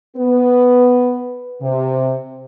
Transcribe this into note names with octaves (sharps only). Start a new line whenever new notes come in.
B3 B4
C3